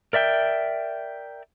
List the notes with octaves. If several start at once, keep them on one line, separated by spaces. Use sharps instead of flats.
A#4 D5 E5 G5